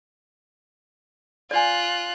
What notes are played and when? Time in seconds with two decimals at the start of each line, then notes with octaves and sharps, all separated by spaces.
1.51 F4 D5 G#5 F#6